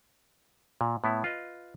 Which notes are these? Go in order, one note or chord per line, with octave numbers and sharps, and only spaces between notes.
A#2
A2 B3 E4
F4 B4 D#5